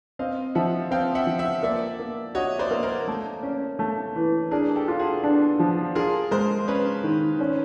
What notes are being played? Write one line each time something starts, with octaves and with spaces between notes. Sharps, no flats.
C4 D#5 F5
F3 E5 F#5
C4 F5 G5
E5 F#5
F3
E5 F#5
A#3 D5 E5
A#3
F#4 C#5 D#5
C5 D5
A#3
A#4 C5
A3
C#4
A3
E3
D4 G#4 A#4
G4 A4
F4
F#4 G#4
D4
F3
F4 G#4 A#4
G#3 A#4 C5
C#4 B4 C#5
D#3
C#4